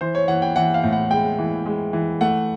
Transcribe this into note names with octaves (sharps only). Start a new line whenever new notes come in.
E3 C5
C#5
E3 F#5
G5
E3 F#5
F5
A2
F#5
G#3 G5
E3
G#3
E3
A3 F#5